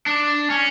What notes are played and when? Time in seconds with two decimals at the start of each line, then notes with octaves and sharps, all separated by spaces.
0.06 D4
0.50 C#4